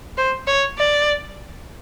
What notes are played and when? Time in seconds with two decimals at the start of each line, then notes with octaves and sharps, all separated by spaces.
0.17 C5
0.47 C#5
0.78 D5